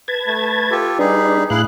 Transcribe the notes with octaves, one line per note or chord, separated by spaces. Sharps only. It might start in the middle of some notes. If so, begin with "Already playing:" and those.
B4 A5 G#6
A3
F4 G4 A4
G3 D4 D#4 G#4 B4
A2 E4 G#4 F5 F#6